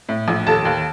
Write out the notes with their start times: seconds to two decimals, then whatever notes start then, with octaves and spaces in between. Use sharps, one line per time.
0.09 A2
0.28 A#1
0.47 D#2 A4 A5
0.65 D#2